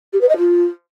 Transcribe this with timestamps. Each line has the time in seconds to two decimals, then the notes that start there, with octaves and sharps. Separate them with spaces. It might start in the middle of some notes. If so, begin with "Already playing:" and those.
0.13 G4
0.21 B4
0.29 D#5
0.37 F4